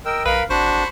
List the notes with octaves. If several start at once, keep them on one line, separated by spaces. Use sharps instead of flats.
A#4 D#5 G5 E6
B1 A#4 B4 F5 B5
G#1 D4 F#4 C5 B5 C#6